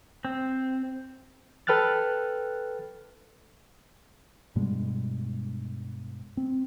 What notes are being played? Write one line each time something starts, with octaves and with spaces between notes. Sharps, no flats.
C4
A4 B4 G5 F6 F#6 A6
G2 B2 G3 G#3
C4